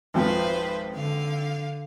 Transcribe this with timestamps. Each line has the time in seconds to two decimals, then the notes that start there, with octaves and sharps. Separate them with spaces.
0.14 G#1 F2 F3 B4 C5
0.93 D3 F5